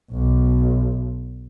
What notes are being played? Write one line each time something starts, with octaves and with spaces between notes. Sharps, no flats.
B1